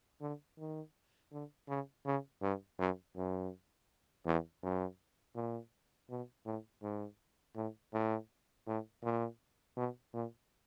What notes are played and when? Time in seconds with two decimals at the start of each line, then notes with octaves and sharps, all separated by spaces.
0.21 D3
0.59 D#3
1.32 D3
1.69 C#3
2.06 C#3
2.42 G2
2.79 F#2
3.16 F#2
4.26 E2
4.63 F#2
5.36 A#2
6.10 B2
6.46 A2
6.83 G#2
7.56 A2
7.93 A2
8.67 A2
9.03 A#2
9.77 B2
10.13 A#2